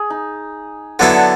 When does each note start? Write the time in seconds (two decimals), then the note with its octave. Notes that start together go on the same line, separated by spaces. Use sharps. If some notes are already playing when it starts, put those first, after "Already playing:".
Already playing: G#4
0.10 D#4
0.99 D3 F#3 B3 D4 E4 A4
1.13 D4